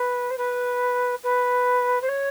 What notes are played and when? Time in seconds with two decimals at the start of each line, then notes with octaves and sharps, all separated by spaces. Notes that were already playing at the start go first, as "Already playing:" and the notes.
Already playing: B4
0.30 C5
0.37 B4
1.23 B4
2.02 C5
2.08 C#5